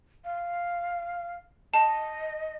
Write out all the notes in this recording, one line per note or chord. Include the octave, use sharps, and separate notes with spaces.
F5
D#5 A5